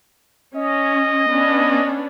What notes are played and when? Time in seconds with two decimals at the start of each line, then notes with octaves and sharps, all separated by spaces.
0.56 C#4 D#5
1.28 B3 C#4 D4